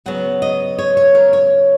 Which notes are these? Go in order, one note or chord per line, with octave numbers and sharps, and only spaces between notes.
C#3 F#3 B3 F#5
D#5
C#5
C#5
A#4
C#5